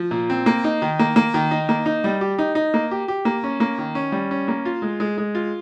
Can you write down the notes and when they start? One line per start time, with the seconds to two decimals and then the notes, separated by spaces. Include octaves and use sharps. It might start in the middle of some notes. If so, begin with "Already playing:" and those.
Already playing: F3
0.11 A#2
0.30 C4
0.46 A#3
0.64 D#4
0.82 D#3
0.99 A#3
1.16 A#3
1.34 D#3
1.51 D#4
1.69 A#3
1.86 D#4
2.04 G3
2.21 G4
2.39 D#4
2.55 D#4
2.74 A#3
2.91 G4
3.08 G4
3.25 A#3
3.44 C#4
3.60 A#3
3.79 D#3
3.95 C#4
4.12 G3
4.31 C#4
4.48 A#3
4.65 F4
4.82 G#3
5.00 G#3
5.18 G#3
5.35 F4